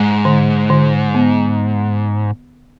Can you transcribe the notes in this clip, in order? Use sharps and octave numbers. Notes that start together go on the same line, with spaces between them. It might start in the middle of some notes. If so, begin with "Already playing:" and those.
Already playing: G#2 G#3
D3
D3
B3